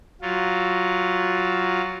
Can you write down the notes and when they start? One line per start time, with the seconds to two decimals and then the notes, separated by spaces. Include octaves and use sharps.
0.21 F#3 F4